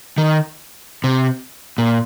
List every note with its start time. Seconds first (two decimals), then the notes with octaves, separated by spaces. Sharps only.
0.18 D#3
1.04 C3
1.78 A#2